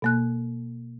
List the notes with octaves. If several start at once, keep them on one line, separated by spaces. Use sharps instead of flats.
B2 A#3 F#6